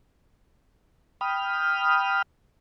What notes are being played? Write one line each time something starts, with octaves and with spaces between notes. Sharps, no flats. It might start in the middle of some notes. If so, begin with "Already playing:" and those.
G5 B5 D#6 F6